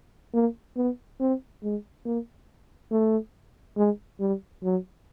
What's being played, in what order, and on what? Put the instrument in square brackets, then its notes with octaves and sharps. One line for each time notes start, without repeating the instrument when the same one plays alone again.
[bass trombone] A#3
B3
C4
G#3
A#3
A3
G#3
G3
F#3